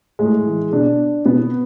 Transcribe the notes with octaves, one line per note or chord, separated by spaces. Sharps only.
A2 G#3
E3
B2 D4
B2 B3